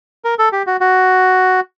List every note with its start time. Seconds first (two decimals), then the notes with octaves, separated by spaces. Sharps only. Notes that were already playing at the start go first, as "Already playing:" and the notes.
0.25 A#4
0.39 A4
0.53 G4
0.67 F#4
0.81 F#4